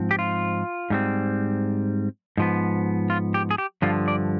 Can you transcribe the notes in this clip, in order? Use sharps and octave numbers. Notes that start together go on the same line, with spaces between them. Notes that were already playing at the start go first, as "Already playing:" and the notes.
Already playing: G#2 F3 C4
G4
F4
G#2 G3 C4
G#2 F3 B3
F4
G4
G#4
G4
G2 D3 F3 F4
D5